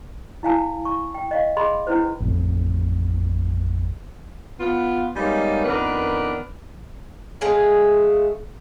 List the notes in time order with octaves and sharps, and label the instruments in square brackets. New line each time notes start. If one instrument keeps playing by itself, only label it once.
[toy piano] E4 F5 G#5 A5
C#6
G5
D#5 F5
G#4 D#5 B5 C6
C#4 D4 E4 B4 C5
[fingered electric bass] A1 F2 A2
[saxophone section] B3 F4
G3 G#3 A#3 B3 C#4 D#4
F2 D#3 B3 D4 A#4 B4
[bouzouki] G#3 A3 G#4 F5